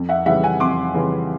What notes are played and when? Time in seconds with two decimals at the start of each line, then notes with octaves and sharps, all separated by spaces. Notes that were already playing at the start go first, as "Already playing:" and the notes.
Already playing: F2
0.09 E5 F#5
0.26 C#3 E3 G3 E5 F#5
0.43 F#5 G#5
0.60 F2 C6 D6
0.94 C#3 E3 G3